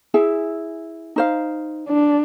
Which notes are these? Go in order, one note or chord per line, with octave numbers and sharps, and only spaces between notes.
E4 G#4 E5
D#4 C5 F5
D4